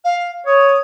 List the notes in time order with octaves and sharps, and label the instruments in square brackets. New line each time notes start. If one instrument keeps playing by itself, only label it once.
[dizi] F5
[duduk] C#5 [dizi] D#6